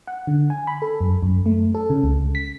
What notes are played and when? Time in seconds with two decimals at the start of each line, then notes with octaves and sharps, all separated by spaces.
0.07 F#5
0.27 D3
0.50 G#5
0.67 B5
0.82 A4
1.01 F#2
1.22 F#2
1.46 A3
1.74 A4
1.90 C#3
2.04 C#2
2.35 B6